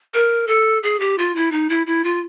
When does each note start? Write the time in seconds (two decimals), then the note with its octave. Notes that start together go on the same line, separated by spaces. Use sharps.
0.14 A#4
0.48 A4
0.83 G#4
1.00 G4
1.18 F4
1.36 E4
1.52 D#4
1.70 E4
1.87 E4
2.04 F4